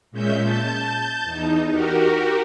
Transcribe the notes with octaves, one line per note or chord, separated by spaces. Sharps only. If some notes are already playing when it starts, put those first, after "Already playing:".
A#2 G#3 C#4 E5 G6
A5 G6
E2 D#4
F#4 G4 A#4